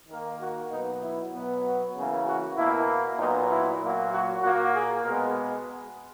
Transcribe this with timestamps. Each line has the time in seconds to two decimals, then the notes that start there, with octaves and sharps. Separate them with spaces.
0.09 D#3 A#3 A#4
0.40 F#4
0.71 B2 F#3 B3 D#4
1.02 E4
1.33 B2 F#3 B3
1.64 F#4
1.95 C#3 E3 A#3
2.26 F#4
2.57 B2 A#3 E4
3.18 A#2 F#3 B3 D#4
3.50 E4
3.81 A#2 F#3 A#3
4.12 F#4
4.43 A#2 A#3 F#4
4.74 G#4
5.05 B2 G#3 B3 A#4